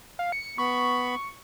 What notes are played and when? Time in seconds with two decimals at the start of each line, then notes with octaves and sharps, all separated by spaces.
0.19 F5
0.32 C#7
0.58 B3 B5 C#6